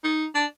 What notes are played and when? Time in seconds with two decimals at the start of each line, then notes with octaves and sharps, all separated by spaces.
0.04 D#4
0.35 D4